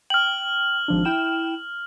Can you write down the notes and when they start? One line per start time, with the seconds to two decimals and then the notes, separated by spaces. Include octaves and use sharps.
0.10 G5 F6 F#7
0.88 G#1 F3 D4
1.05 E4 G5 E7